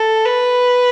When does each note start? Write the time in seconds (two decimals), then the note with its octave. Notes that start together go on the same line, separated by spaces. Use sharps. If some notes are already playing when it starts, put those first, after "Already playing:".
Already playing: A4
0.25 B4